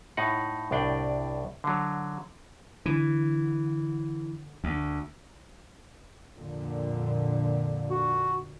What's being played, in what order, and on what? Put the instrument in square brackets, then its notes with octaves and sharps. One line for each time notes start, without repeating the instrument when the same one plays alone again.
[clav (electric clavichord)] A2 D#4 F#5
C2 A2 D4 D5 G5
D3 F#3
[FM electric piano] D3 [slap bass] E3
[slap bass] D2
[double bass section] F2 A#2 D3
[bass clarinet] F#4